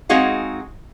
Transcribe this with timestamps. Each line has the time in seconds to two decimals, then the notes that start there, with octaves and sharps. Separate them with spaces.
0.09 G#3 C4 D#4 F#4 G#4 F5